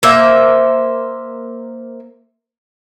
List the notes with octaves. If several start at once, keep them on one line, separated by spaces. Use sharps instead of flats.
A#3 C5 E5